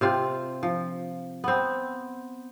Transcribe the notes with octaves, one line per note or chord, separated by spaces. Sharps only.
C3 C4 F4
F3
B3 C4